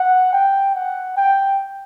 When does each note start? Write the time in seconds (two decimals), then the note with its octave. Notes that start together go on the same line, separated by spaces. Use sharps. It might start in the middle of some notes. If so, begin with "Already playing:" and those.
Already playing: F#5
0.32 G5
0.75 F#5
1.17 G5